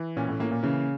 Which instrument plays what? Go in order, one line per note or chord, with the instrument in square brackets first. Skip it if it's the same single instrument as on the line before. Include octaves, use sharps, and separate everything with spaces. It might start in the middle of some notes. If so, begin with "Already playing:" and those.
Already playing: [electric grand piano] E3
[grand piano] A#2 [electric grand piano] C#4
[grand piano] A2
[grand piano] A2 [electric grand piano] A#3
[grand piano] A#2
[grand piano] C#3 [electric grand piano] E3